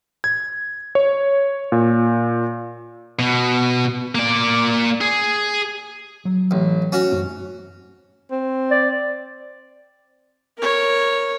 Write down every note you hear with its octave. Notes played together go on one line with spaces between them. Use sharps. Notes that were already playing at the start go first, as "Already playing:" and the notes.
G#6
C#5
A#2
B2
A#3 D5
G#4
F#3
A1
C#4 F#4
F#2 A3 C4
C4
D5
A#4 C#5